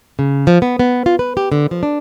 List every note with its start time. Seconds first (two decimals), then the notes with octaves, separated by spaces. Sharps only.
0.19 C#3
0.47 F3
0.62 B3
0.79 B3
1.06 F4
1.19 B4
1.37 G4
1.52 D3
1.71 F3
1.83 D4